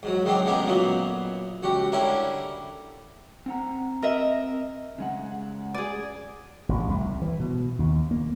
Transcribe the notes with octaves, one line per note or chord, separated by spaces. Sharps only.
G#2 F#3
D#3 F#3 G#3 C4 D4 D#4
A1 D3 G#3 B3 G4 A#4
F#2 A#2 F#3 A#3 B3
C#2 F#4 G4
D3 G3 C#4 E4 G4 A#4
C4 F#5 A#5
A#4 D#5 E5
C#3 G#3 F#5
G#4 D5
A1
C2
E3
B2
D#2
A#3